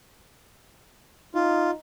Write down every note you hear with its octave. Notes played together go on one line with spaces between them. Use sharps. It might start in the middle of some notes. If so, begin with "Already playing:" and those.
D#4 F4